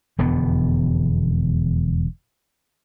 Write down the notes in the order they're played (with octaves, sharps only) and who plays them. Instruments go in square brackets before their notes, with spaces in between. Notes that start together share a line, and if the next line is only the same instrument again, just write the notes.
[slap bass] E1 F2 D3 B3